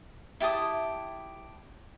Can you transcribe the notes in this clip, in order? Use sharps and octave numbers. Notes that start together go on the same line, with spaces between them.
E4 G4 A5 D#6